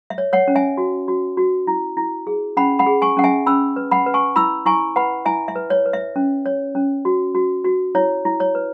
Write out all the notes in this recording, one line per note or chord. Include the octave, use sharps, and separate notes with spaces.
E5
C#5
C#5 F#5
C#4
E5 G#5
F#4
F#4
F#4
E4
E4
G#4
C#4 F#5 B5
F#5 B5
G#4
G#5 C#6
C#4 F#5
E5 G#5
C#4 B5 E6
B4
F#5 B5
B4
G#5 C#6
E4 B5 E6
E4 G#5 C#6
B4 F#5 B5
E4 E5 G#5
E5
B4
C#5
B4
E5
C#4
C#5
C#4
F#4
F#4
F#4
E4 C#5
E4
C#5
B4